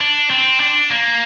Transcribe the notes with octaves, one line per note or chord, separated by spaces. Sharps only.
D4
C4
D4
A#3